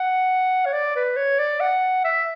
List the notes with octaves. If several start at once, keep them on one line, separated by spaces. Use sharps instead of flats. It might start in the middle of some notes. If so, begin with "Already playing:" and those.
Already playing: F#5
C#5
D5
B4
C#5
D5
F#5
E5